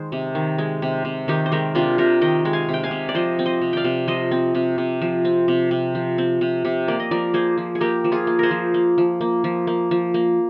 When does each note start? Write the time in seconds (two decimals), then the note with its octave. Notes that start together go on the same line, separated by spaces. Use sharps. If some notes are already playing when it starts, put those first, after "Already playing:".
Already playing: D#3 G#3 C5
0.12 C3
0.35 D#3
0.58 G#3
0.82 C3
1.05 C3
1.28 D#3 D#4 G4
1.46 C5
1.52 G#3 G4 A#4
1.75 C3 D4 F4
1.98 C3 G4 A#4
2.21 D#3 D#5 G5
2.45 G#3
2.53 F5 G#5
2.69 C3
2.74 G5
2.83 F5 G#5
2.91 C3
3.09 D5
3.15 F3 C5 D#5
3.39 C4
3.46 C5 D#5
3.61 C3
3.73 D5 F5 G5
3.84 C3
4.08 F3 C5 D#5
4.31 C4
4.55 C3
4.78 C3
5.01 F3
5.25 C4
5.48 C3
5.71 C3
5.95 F3
6.18 C4
6.41 C3
6.65 C3
6.88 A#3 D5
7.00 D#5
7.11 F3 A#4 D5
7.34 A#3 G#4 C5
7.58 F3
7.75 G#4
7.81 A#3 G4 A#4
8.04 F3
8.12 F4 G#4
8.27 A#3
8.39 G#4 A#4 C5
8.51 F3
8.74 A#3
8.98 F3
9.21 A#3
9.44 F3
9.67 A#3
9.91 F3
10.14 A#3